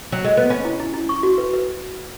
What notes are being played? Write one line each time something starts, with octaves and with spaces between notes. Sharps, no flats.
F#3
G#3
B3
C#4 B5
E4
E4
E4
C#6
F#4
B4
B4